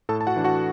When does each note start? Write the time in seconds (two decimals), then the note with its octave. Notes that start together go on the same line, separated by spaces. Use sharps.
0.09 A2 A4 A5
0.21 A5
0.27 F#4 F#5
0.36 E3 D4
0.44 F#4 F#5